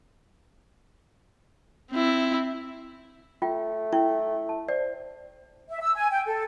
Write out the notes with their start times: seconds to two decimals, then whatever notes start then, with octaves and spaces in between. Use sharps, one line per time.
1.91 C4 E4
3.42 A3 F4 G5
3.93 E4 G5
4.49 A5
4.69 C5 D5
5.69 E5
5.81 E6
5.95 G#5
6.11 G5
6.26 A4